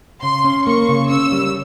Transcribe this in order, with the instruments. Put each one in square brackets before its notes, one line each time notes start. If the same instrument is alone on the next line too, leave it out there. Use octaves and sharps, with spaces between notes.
[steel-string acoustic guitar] C#3 [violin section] C6
[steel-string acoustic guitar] C#4
[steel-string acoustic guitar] A#3 [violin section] C#6
[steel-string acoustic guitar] C#3
[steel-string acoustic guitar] C#4 [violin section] E6
[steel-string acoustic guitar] G3